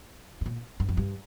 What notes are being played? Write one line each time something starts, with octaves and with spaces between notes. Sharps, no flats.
G#2
A#2
G2
F2
G2